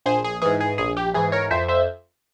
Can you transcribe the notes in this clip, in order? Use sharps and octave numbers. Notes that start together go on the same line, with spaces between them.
A#1 G#4 C5
G#4
G#2 E3 G#4
G#4
A#1 G#4
G4
G#2 E3 G#4
A#4 C#5
F2 C5 E5
C5 E5